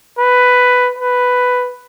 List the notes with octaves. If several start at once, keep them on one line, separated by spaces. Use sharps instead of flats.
B4
B4